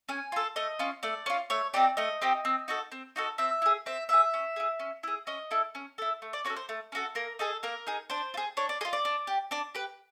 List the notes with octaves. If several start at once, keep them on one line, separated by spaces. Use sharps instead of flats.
C#4 G#5
F4 A4
A3 D#5
C#4 F4
A3 D5
C#4 F4
A3 C#5
C4 D#4 G4 D5
A3 D#5
C4 D#4 G4
C4
D#4 F#4 A4
C4
D#4 F#4 A4
C4 E5
E4 G#4
C4 E5
E4 G#4 E5
C#4
E4 G#4
C#4
E4 G#4
C#4 D#5
E4 A4
C#4
E4 A4
A3
D5
C#4 F#4 A4 C#5
C5
A3
C#4 F#4 A4
A#3 A#4
D#4 G#4 A4
A#3 A#4
D#4 G#4
D4 C5
F4
G#4
D4 C#5
D5
G#4 D#5
F4
D5
D4
G4
D4 D5
G4 B4